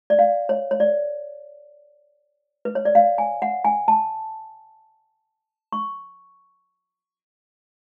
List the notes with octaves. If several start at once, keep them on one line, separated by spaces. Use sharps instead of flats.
D5
F5
C#5
C#5
D5
B4
C#5
D5
F5
G#5
F#5
G#5
A5
C#6